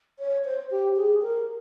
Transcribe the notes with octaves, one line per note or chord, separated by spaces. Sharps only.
C#5
C5
G4
G#4
A#4